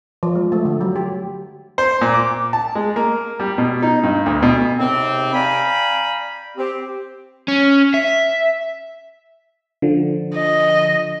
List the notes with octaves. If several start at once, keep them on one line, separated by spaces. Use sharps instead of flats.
F3
G#3
A3
D3
F#3
G4
C5
A#2
D6
A5
G#3
A#3
G3
B2
D#4
G2
D2
B2
D#2 G#2 C3 C4
D5 F5 G5 G#5 A#5 B5
C4 G4
C#4
E5
D3 F3
D#5